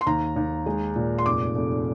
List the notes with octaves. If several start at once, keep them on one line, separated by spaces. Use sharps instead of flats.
C6
D#2 A#5
D#2
G#3
A#2
C6
F1 D6
F1